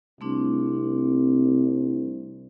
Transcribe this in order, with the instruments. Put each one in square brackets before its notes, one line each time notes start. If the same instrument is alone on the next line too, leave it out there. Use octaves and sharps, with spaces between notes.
[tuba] C2 [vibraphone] A3 C4 D4